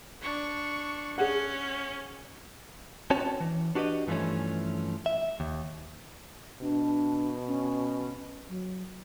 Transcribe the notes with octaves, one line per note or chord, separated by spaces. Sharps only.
D4 C#6
C#4 G#4 F#5
C4 C#4 F#4 C#5 A5
E3
D4 F#4 G4 B4 D#5
G2 E3 F3 G3 A3 C#4
E5
D#2
B2 D4
C#4
F#3